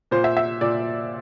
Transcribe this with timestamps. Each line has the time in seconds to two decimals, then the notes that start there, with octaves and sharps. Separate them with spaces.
0.11 A#2 C5
0.24 E5
0.37 E5
0.61 A#2 D5